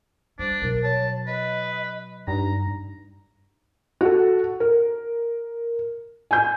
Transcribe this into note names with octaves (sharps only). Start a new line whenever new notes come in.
G3 D4 C5
B2 F#3 A#4
C#5 A5
B4 D#5
G2 D#4 A#5
F#4 A4
A#4
G#5 G6